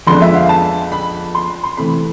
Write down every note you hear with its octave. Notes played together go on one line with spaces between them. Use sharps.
F2 D3 G#3 B3 D4 C6
E5
F5
A5
B5
C6
C6
C3 E3 A3 C4 B5